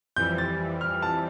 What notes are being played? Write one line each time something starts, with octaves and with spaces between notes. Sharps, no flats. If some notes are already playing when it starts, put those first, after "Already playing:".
F2 E3 G3 G6
A6
F6
A5